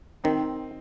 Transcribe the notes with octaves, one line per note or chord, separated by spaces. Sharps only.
D#3 C4 D#4